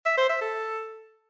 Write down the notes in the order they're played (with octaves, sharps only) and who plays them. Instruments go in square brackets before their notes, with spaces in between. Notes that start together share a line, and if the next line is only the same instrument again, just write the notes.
[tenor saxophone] E5
C5
E5
A4